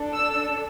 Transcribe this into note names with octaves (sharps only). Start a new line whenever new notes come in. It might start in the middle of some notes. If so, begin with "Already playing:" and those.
Already playing: D4 A4
E6